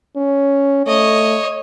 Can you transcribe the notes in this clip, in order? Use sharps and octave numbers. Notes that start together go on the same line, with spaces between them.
C#4
A3 C#5 D#5